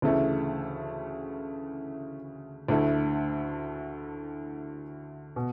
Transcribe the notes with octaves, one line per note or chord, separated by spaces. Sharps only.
D2 C#3 E3 A3 E4
D2 D3 A3 E4
B2